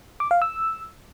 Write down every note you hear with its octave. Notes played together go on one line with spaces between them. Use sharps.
D6
F5
E6